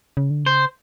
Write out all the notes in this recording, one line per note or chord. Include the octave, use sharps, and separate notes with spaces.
C#3
D3
C#3 C5